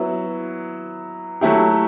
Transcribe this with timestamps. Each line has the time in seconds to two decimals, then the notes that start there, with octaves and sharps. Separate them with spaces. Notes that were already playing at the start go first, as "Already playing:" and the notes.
Already playing: F#3 B3 E4
1.41 F#3 A3 E4 G4